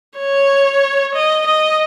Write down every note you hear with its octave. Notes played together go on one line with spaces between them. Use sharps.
C#5
D#5
D#5